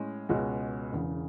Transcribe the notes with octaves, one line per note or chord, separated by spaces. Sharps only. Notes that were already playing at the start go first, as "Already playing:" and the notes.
Already playing: A2 G#3 C#4
C#2 B2 G#3 C#4 F#4
E1 E2 C#3